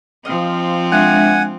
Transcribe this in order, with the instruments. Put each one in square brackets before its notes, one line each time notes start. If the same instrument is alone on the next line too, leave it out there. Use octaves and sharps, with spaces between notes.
[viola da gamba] F3 C4 [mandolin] D#5 F5
[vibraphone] G#3 D4 E5 [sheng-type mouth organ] F#5 G#5 [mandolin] F#6